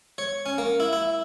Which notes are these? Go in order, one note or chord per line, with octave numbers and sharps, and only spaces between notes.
C#5
C#4
A#3
E4
E4